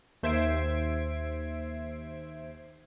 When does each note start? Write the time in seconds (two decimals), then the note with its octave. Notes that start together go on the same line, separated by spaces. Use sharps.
0.23 D#2 C5 E5 G#6 C7 D7